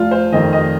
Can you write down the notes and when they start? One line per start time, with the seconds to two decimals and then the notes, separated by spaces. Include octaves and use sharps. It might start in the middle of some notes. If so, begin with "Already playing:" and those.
Already playing: F1 F4
0.11 C5
0.32 F2 D#3 D#5
0.53 D#5